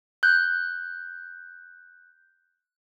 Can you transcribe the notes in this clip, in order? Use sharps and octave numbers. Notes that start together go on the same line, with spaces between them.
F#6 G6